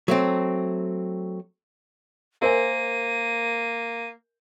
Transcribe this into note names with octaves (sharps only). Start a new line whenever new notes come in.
F#3 A3 C4
A#3 A#4 C5 E5 G#5 D#7